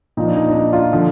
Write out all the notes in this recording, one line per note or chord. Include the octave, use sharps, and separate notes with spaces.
A#2 F3 D#4
D4
D#4
D4
D#4
F4
D3 F3